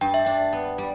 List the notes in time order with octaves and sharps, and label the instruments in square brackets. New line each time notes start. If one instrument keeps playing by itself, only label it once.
[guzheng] G2 [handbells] G5
[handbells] E5
[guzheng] D4 [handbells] G5
[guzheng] B3
G3